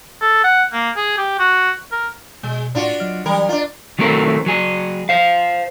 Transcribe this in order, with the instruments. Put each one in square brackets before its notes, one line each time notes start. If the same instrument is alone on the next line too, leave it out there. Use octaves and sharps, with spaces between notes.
[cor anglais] A4
F#5
A#3
G#4
G4
F#4
A#4
[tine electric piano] B2 [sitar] G#3
[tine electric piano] A2 [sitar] D4 F4 F#4
[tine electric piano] F#3 D#5 F6
[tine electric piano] E3 F#3 [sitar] G3 A#4
[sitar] D4 F4 [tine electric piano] D#5 A#5
[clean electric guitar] D#3 F#3 A3 C4 A#4
F#3 G#4
C5 F5